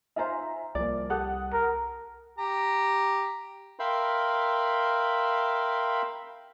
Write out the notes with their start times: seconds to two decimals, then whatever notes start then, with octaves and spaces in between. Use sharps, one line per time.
0.16 D#4 F4 C5 E5 G#5 A#5
0.75 C2 F3 A#3 D5
1.10 G4 A4 F#5 D#6 F#6
1.53 A#4
2.38 G4 A#5
3.79 A#4 E5 F5 G5 B5 C6